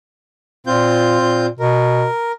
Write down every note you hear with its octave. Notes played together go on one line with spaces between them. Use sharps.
A#2 C4 F4 G6
A#2
B2 A#4